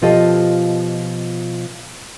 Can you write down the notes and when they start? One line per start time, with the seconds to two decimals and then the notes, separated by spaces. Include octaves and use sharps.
0.02 B2 F3 F4 G4 A4 D#5